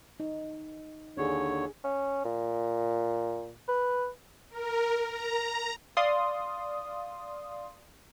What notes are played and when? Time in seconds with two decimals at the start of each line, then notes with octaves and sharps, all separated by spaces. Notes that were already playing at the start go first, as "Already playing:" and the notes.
0.20 D#4
1.17 D#2 D3 D4 G#4 C#5
1.84 C#4
2.25 A#2
3.68 B4
4.50 A#4
5.05 A#5
5.97 D5 F5 C6 D#6